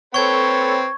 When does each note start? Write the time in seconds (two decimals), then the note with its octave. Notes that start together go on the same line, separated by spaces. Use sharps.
0.14 C4 A4 B4 C#5 C#6 G#6